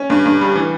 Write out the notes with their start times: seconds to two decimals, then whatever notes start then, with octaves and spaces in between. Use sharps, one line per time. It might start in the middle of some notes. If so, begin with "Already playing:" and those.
Already playing: C#4
0.10 G2
0.25 G2
0.41 G3
0.56 E3